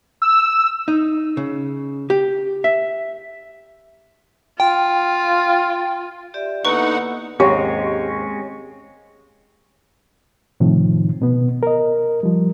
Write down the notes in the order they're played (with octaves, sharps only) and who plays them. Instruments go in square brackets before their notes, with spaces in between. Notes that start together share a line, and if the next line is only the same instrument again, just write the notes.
[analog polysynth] E6
[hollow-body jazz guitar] D#4
C#3
G4
E5
[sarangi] F4 [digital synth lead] G5
[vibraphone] G4 D5 E5
[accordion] D3 D#4 F#5 [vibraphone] A#3 B3 E4 [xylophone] B4 C#6
[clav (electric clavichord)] D#2 G#2 [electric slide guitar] G#3 C4 C#4 [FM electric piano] G4 [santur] C#5
[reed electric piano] A2 C3 D#3 F3
B2 B3
A#4 D#5
F3 G3